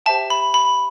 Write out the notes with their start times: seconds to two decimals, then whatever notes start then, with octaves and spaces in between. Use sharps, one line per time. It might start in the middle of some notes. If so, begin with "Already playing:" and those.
0.06 G4 C5 E5 G5 A5
0.30 B5
0.54 B5